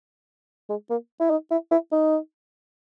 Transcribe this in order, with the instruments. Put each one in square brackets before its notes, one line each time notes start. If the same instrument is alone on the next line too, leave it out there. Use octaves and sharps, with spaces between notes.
[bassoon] G#3
A#3
E4
D#4
E4
E4
D#4